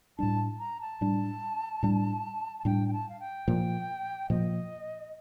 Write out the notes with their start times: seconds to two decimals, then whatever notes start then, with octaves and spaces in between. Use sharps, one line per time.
0.19 A2 G3 D4 A5
0.59 A#5
0.81 A5
1.01 A2 G3 D4
1.83 A2 G3 D4
2.59 A5
2.65 A2 G3 D4 G5
2.88 G5
2.93 A5
3.09 F5
3.20 G5
3.48 A#2 F3 A#3
4.30 A#2 F3 A#3 D#5